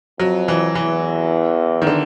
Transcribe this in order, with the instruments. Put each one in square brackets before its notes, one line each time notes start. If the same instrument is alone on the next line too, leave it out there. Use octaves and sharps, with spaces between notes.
[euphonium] F2 [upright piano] F#3
[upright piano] E3
[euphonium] E2 [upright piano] E3
[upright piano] D#3
D3